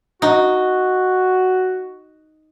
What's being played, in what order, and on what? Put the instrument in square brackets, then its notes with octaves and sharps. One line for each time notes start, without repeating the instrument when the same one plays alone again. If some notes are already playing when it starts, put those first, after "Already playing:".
[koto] D#4 [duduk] F#4